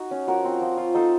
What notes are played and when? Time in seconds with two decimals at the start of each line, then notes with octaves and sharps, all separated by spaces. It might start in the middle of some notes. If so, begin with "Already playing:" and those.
Already playing: D#4 F#4
0.11 C#4
0.27 F3 F#4 A#4
0.45 C4
0.62 F3
0.77 F4
0.94 D#4 A4 C5